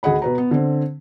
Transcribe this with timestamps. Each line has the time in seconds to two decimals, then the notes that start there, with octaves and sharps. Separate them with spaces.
0.03 D2 G#4 D#5 F#5 B5
0.22 B2 B4 A#5
0.38 B3
0.51 D3 C4